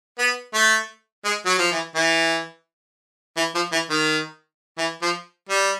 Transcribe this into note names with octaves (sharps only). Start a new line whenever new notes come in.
B3
A3
G#3
F#3
F3
E3
E3
E3
F3
E3
D#3
E3
F3
G3